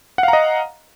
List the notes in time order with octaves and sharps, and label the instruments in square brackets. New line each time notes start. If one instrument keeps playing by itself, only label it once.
[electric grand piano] F#5
F5
A#5
D#5